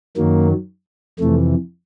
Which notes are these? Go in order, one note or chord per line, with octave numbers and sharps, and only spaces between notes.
F#2 D#3 F#3 A#3
F2 C3 E3 A3